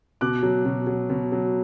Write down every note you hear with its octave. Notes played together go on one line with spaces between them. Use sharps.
B2 D6 F#6
F#3
B2
F#3
B2
F#3